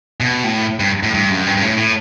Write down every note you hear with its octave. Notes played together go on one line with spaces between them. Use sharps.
B2
A2
G2
A2
G2
F#2
G2
G2
A2
A2